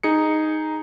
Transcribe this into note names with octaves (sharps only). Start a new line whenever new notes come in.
D#4 G#4 C#7